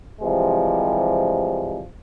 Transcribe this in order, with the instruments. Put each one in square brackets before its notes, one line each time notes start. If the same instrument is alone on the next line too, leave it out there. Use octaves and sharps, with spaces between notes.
[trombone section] C3 E3 F3 G3 G#3